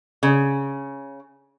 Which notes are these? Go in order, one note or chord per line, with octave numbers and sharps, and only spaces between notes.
C#3